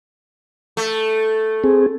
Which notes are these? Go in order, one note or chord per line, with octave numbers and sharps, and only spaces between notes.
A3
C4 G#4